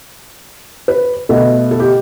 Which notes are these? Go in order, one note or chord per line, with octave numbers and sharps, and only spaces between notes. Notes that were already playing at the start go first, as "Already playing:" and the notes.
B4
B2 A3
A4
G4